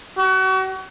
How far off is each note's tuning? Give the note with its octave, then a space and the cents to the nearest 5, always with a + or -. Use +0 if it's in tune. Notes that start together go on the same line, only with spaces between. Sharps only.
F#4 +35